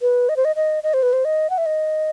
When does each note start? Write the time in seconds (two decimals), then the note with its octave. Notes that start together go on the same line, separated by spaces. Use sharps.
0.02 B4
0.29 D#5
0.37 C5
0.45 D#5
0.56 D#5
0.83 D#5
0.94 C5
1.03 B4
1.13 C5
1.25 D#5
1.50 F#5
1.58 E5
1.66 D#5